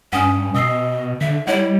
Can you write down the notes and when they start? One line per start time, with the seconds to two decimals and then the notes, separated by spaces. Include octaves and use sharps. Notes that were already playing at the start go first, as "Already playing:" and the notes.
0.13 G2 C#4 F#5 G#5 D#6
0.55 B2 D#5 D#6 E6 C7
1.21 D3 E5
1.47 G3 E4 C#5 D#5 F#5